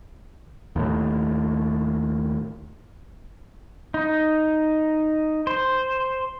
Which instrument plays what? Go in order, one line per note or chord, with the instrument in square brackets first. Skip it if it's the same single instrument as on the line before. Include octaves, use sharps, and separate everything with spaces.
[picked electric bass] D#2 A2
[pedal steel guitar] D#4
C5